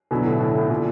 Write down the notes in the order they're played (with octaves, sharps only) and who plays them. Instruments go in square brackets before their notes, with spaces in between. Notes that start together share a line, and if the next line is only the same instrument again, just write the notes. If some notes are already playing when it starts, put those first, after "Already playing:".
[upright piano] B2 [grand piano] D3 F#3 B3 E4
[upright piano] A2
A2
A2
A#2